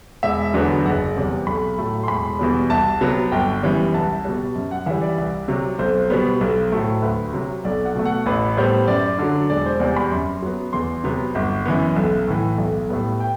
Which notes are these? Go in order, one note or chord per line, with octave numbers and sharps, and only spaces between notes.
E1 E5
E2 D3 F#3 B3
F#1 F#5
E2 C3 G3
B1 B5
A2 F#3 A3
C6
E1 B5
E2 B2 G3
C2 A5
C3 F#3 B3
G1 G5
F#2 E3 G3 B3
C2 A5
B2 G3
F#2
F#5
E3 G3 E5
D5
C2
C3 F#3
B1 C5
B2 G3 B3
B1
A2 F#3 A3
D2 B4
C3 F#3
B1 D5
F#5
B2 A3
F#5
A1 B4
A2 G3 B3 C5
F#2 D5
D3 F#3
E1 D5
C5
E2 C3 G3 D5
B5
F#2 C6
F#3 B3
E2 C6
C3 F#3 B3
G1
F#2 E3 B3
B1
A2 E3
B1
A2 G3 B3
G5